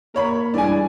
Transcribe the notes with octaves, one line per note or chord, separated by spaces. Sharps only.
A#3 A#4 C#5 B5
G2 E3 G#3 D4 D5 G#5